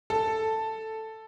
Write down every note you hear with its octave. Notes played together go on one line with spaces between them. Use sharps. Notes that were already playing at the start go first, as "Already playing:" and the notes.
A4